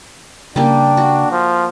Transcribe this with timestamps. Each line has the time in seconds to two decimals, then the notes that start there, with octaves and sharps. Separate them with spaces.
0.56 C#3 G3 A#3 D4 G5
0.97 F#4
1.31 F3